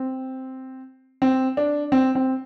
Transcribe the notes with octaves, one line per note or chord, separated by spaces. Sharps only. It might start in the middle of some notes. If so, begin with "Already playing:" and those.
Already playing: C4
C4
D4
C4
C4